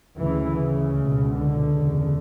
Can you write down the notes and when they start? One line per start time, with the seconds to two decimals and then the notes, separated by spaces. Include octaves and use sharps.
0.17 D2 C#3 E3
0.57 C#3
0.94 C#2 B2
1.34 D3
1.72 E2 C#3